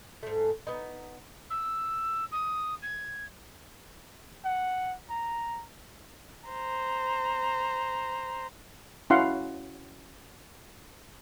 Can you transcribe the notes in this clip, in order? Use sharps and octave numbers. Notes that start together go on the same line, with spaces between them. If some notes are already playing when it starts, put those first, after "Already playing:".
G#2 A3
B3 D#4
E6
D#6
G#6
F#5
A#5
C5 A#5
C#4 E4 F#4 F5 F#5 C6